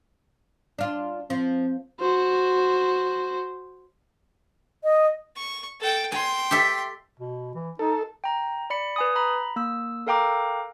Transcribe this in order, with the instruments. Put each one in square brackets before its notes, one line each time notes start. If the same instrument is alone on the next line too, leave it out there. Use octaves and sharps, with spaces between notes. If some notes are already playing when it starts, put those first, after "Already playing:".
[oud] D4 F4
[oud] F3 [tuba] C4
[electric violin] F#4 C5
[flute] D#5
[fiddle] C#6
A4 G5
[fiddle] G5 C6 [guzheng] G#5
[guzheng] G4 A4 E5
[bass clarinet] B2
E3
[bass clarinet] D#4 [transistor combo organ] A4
[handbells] G5 A#5
D5 B5 C#7
B4 G#5 D#6
A#5 B5
A#3 E6
A4 A#4 F5 G5 A#5 D6